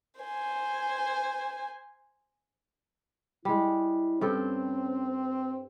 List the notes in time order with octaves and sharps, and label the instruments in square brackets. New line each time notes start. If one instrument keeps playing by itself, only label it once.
[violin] C5 G#5
[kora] G3 G#3 [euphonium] E4
[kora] G2 A4 G5 [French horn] C4 [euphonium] C#4